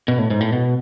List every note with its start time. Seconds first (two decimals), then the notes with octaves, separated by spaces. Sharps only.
0.08 B2
0.19 A2
0.30 G#2
0.41 A2
0.52 B2